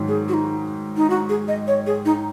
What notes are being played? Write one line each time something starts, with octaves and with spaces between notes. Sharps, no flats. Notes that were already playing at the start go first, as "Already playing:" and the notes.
Already playing: G#2 D#3 F#3
G#4
F#4
D#4
D#4
F#4
G#4
D#5
C#5
G#4
D#4